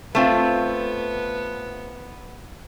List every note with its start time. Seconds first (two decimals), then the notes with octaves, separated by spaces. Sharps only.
0.15 A3 B3 C4 F4